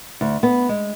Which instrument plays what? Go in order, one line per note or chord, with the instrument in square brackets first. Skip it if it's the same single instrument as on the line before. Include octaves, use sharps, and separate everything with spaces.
[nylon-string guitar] D2
B3
G#3